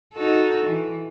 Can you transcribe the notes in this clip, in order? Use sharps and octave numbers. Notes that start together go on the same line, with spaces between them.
D#4 F#4 A4
E3